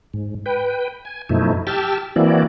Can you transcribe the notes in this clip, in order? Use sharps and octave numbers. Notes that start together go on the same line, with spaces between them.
G#2
B4 G5
G#5
F#2 B2 F3 A3 D#4 E4
G4 G5 A5 E6 F6
E3 A#3 C4 E4 F#4 D5